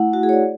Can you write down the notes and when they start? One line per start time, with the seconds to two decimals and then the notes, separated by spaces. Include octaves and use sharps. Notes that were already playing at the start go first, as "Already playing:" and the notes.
Already playing: A3 E4 F#5
0.13 F#4
0.23 G#4
0.29 C#5
0.33 D5